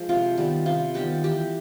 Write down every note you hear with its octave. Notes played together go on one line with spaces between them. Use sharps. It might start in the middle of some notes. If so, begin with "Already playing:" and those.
Already playing: F3 G#3
C3 F4
D#3 G3 B3
C3 F4
D#3 G3 B3 G4
E3 G4